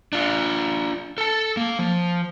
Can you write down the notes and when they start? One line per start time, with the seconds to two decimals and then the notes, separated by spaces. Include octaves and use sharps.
0.13 D4 F4
1.18 A4 A5
1.57 A#3
1.79 F3